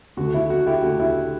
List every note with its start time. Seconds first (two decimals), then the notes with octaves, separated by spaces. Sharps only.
0.17 D2 D3 F#4
0.34 E4
0.50 F#4
0.67 E4 G4
0.83 D2 D3 F#4
0.99 E4